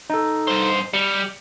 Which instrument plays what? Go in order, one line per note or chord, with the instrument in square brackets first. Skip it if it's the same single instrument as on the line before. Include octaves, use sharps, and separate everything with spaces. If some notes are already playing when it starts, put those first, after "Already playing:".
[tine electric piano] D#4 A4
[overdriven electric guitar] G2 C5
[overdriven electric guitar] G3 [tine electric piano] C#7